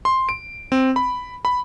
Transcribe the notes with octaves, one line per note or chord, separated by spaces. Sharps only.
C6
D7
C4
B5
B5